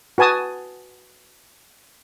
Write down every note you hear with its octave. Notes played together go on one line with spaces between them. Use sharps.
F#4 B4 G#5 A5 D#6